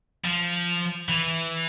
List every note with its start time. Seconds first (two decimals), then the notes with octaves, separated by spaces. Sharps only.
0.24 F3
1.09 E3